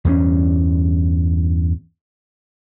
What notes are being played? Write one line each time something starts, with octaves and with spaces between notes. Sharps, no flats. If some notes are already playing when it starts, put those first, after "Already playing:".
E2 G2 B3 C#4